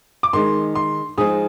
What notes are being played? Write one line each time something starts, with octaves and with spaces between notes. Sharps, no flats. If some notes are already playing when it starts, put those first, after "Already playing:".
D6
D#3 G#3 D#4 C6
C6
F3 G#3 D#4 G#4 D#6